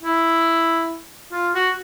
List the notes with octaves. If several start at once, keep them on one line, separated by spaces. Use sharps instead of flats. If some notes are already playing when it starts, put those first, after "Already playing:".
E4
F4
F#4